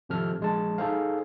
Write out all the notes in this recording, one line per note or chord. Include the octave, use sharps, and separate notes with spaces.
G#1 C3 F3 A4 F6
A#1 G#3 A5
D#4 G#4 A4 C5 F5